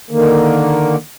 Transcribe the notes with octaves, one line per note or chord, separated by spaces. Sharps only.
D3 D#3 A#3